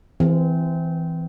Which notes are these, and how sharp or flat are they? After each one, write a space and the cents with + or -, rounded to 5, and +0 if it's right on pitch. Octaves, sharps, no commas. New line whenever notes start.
E3 +0 C4 -20